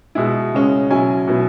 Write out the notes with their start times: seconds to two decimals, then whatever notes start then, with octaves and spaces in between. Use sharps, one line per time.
0.15 B2 G#3 E4
0.53 C#3 G#3 C#4
0.90 B2 F#3 C#4 E4 G#5
1.28 B2 F#3 B3 E4